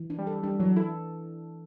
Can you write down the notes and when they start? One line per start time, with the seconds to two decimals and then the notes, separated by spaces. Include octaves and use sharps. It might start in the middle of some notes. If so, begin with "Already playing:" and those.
Already playing: E3
0.10 D4
0.19 G3
0.27 A4
0.43 G3 D4
0.59 E3 F#3
0.76 E4 A4